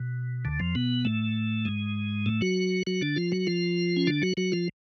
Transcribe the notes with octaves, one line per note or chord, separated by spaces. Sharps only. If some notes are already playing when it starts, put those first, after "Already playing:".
Already playing: B2
D2 D3
F2 F3
B2 B3
A2 A3
G#2 G#3
A2 A3
F#3 F#4
F#3 F#4
D3 D4
F3 F4
F#3 F#4
F3 F4
C#4
D3 D4
F#3 F#4
F#3 F#4
F3 F4